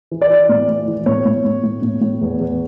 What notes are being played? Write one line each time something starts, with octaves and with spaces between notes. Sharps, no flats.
E3
D5
E3
A2
E3
E3
A2 C#5
A2
A2
A2
A2
A2
E2
E2